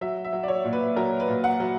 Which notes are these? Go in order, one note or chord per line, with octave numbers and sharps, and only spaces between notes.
F#3 E5
E5
F#3
D5
C#5
A#2
B4
F#3 A#4
B4
A#2
F#5
F#3